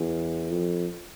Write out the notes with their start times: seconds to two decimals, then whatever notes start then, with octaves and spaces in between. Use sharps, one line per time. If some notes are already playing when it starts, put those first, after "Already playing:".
Already playing: E2
0.51 F2